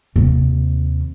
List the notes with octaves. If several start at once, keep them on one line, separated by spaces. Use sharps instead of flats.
D#2 C3